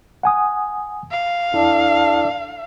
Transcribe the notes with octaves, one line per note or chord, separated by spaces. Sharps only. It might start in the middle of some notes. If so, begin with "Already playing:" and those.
F#5 G#5 D#6
F5
E2 D4 E4 A4